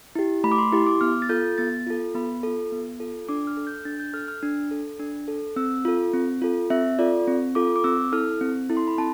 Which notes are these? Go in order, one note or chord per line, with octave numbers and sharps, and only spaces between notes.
E4 G4
A3 B5
D6
C6
E4 G4 C6
D6
B3 F6
A6
F4 A4 G6
B3 A6
F4 A4
B3 B5
F4 A4
B3
F4 A4
D4 D6
F6
A4
G6
D4 A6
G6
A4 F6
F6
D4
A4
D4
A4
C4 E6
F4 A4
C4
F4 A4
C4 E5
F4 A4 D5
C4
F4 A4 D6
D6
C4 E6
E4 A4 F6
C4
E4 A4
C6
B5
C4 A5